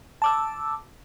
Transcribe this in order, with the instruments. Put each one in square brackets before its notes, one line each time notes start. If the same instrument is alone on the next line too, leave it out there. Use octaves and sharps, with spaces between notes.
[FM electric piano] A5 D6 E6